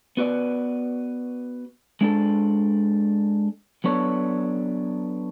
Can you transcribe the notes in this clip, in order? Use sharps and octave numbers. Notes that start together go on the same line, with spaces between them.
B3 F#4 B4 D5
G#3 D4 A4
F#3 B3 D4 A4 C#5